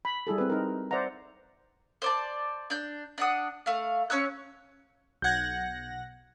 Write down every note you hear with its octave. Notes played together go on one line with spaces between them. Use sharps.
B5
G3 E4 G#4 A4
C4 B4
D#4 A#4
C5 D5 E5 F#5 A#5
C5 D5 A5
D4 G6
D4 F#5 D#6
A3 F5
C#4 C#5 E6 F#6
B1 F#5 G6 G#6 A#6